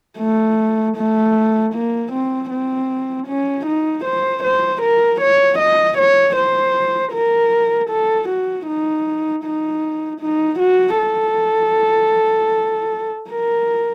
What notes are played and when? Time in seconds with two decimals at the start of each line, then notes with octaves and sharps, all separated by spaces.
0.19 A3
0.97 A3
1.74 A#3
2.13 C4
2.51 C4
3.27 C#4
3.66 D#4
4.05 C5
4.43 C5
4.82 A#4
5.21 C#5
5.59 D#5
5.98 C#5
6.36 C5
7.13 A#4
7.90 A4
8.29 F#4
8.67 D#4
9.44 D#4
10.21 D#4
10.60 F#4
10.98 A4
13.30 A#4